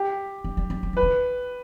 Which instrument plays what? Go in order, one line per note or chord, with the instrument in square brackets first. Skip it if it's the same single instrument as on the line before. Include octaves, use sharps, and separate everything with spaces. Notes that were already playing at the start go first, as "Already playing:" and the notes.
Already playing: [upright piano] G4
[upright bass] G3
G3
F#3
F#3
[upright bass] E3 [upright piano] B4
[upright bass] D3